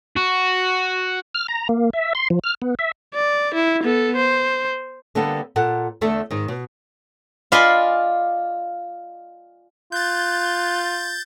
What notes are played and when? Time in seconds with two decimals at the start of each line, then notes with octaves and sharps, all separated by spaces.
0.17 F#4
1.35 F6
1.48 A#5
1.69 A#3
1.93 E5
2.15 C6
2.30 F3
2.44 F6
2.62 B3
2.79 E5
3.14 D5
3.54 E4
3.83 B3 A4
4.16 C5
5.15 D3 G3 A#3 B3 A4
5.56 A#2 A4 F#5
6.01 E2 D3 A3 A4 E5
6.31 G#2 D#3
6.48 B2
7.52 F4 D5 D#5 G#5 B5 C6
9.92 F4 F#6 G6 A6